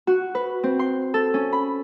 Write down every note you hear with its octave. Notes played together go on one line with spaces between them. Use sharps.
F#4
B4
C4
C6
A4
C#4
B5